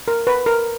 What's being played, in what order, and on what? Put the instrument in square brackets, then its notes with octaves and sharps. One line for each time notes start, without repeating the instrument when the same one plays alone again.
[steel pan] A#4
B4
A#4